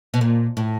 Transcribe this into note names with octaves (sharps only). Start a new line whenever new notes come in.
B2
A#2
A2